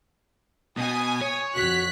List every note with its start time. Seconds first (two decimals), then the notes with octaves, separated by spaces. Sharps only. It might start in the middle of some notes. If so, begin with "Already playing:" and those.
0.77 B2 G#5 D#6
1.22 C#5
1.55 F2 F#4 F#6 B6